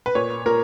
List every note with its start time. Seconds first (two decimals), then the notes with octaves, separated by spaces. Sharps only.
0.06 B4
0.15 A#2 C#5
0.46 A#2 A#4